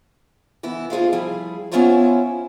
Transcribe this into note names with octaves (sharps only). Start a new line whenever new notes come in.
E3 B3 E4
F4 G#4 C5 F5
F3 G3 E4 G#4
B3 C#4 E4 F4 C5 C#5